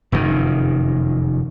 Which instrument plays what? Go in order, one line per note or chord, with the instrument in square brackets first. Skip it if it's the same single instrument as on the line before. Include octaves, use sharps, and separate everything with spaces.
[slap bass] F1 F#2 B2 D#3